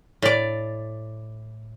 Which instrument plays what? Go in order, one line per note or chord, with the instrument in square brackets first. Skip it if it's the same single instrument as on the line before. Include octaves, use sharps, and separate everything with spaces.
[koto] A2 D5